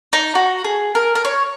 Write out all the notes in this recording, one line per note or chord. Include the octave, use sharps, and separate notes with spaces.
D#4
F#4
G#4
A#4
A#4
C#5